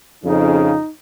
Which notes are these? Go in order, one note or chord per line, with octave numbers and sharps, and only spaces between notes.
F2 C#3 D#4